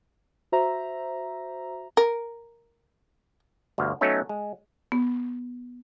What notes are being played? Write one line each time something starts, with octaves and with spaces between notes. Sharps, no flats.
F#4 C5 E5 A#5
A#4
G1 D2 B2 F5
F#3 A3 B3 C#4 D#4
G#3
B3